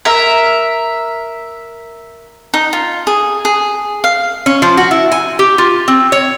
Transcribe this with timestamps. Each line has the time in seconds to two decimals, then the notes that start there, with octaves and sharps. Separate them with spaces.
0.05 A#4 E5
2.54 D#4
2.73 F4
3.07 G#4
3.45 G#4
4.04 F5
4.46 C#4
4.62 F3
4.77 F#4
4.91 E4
5.12 G#5
5.39 G4
5.58 F4
5.88 C4
6.12 C#5